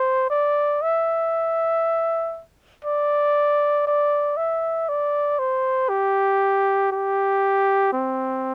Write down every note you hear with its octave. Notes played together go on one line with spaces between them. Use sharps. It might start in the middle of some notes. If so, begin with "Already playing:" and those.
Already playing: C5
D5
E5
D5
D5
E5
D5
C5
G4
G4
C4